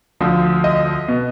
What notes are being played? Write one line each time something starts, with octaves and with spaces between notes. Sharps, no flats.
D2 D3 F3
D#5
B2